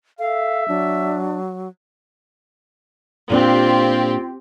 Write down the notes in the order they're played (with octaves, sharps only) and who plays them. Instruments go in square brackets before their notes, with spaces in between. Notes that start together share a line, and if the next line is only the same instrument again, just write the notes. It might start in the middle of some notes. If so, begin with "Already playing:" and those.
[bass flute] A4 [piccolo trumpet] E5 [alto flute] F5
[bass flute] F#3 [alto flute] D4
[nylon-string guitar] A#2 D4 F5 [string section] C4 G4 [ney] F4